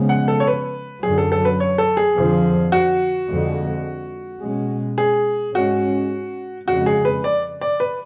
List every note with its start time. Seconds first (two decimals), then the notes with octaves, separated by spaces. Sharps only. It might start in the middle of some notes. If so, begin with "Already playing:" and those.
Already playing: C#3 F3 G#3 B3
0.09 F#5
0.28 A4
0.40 C#5
0.47 B4
1.03 F#2 D3 F#3 G#4
1.18 A4
1.32 A4
1.45 B4
1.60 C#5
1.78 A4
1.97 G#4
2.16 F2 D3 F3
2.72 F#4
3.29 F2 D3 G#3
4.42 B2 G#3 C#4
4.98 G#4
5.55 G#2 G#3 C#4 F#4
6.68 F2 C#3 G#3 F#4
6.86 G#4
7.05 B4
7.24 D5
7.61 D5
7.80 B4